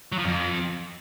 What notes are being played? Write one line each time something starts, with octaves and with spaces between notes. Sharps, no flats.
F#3
F3
F2